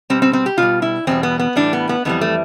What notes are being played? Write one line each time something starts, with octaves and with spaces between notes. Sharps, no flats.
B2 G3 C4
C4
C4
G4
B2 G3 F4
E4
E2 B2 G3 C4
B3
B3
A2 E3 G3 D4
B3
B3
F2 E3 G3 B3
A3